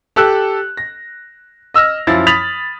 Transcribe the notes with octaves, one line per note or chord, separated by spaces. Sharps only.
G4 A4 E6 F#6
A#6
D#5 E6 F6 A#6
F#2 F3 E4 A6
B5 D#6 A6 B6 F7 F#7